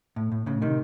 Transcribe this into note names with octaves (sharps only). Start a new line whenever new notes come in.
A2
A2
A2 C#3
C3 D#3